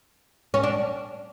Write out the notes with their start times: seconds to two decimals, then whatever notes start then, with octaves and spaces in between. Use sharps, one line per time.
0.54 C#4
0.63 D4